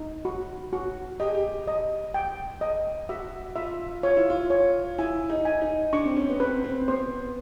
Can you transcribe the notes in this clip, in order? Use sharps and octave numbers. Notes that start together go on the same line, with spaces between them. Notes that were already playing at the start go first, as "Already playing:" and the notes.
Already playing: D#4
F#4
F#4
G4 D#5
G#4
G4
D#5
G5
D#5
F#4 E5
F4 E5
F4 C#5
E4
F4
C#5
E4 G#5
D#4
G#5
D#4
D4 C#6
C4
C#4
B3
C4 B4
C4
B3 C5